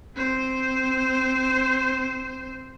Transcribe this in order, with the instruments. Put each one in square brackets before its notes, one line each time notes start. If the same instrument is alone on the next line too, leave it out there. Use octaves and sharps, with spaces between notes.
[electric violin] C4 C5